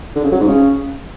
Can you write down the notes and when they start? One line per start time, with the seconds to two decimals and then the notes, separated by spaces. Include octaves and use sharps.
0.16 D3
0.24 C#3
0.32 F#3
0.40 G#2
0.48 C#3